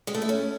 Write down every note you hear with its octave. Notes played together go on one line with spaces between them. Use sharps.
G#3
A3
E4
C#4